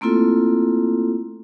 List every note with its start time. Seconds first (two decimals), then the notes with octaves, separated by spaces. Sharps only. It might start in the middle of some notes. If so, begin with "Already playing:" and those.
0.01 A3 A#3 C4 E4 F4 A4